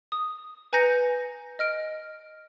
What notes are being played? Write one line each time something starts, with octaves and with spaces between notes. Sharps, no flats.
D#6
B4 G#5 A#5 G6 A#6 C#7
D#5 F6 D7